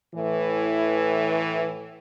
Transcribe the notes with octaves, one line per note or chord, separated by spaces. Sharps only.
A2 E3